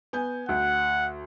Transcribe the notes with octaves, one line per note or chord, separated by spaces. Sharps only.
B3 G#5 G6
D2 F#5